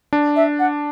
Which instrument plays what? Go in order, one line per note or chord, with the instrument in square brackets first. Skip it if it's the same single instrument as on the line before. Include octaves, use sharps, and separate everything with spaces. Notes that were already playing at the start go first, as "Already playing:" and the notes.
[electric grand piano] D4
[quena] E5
F#5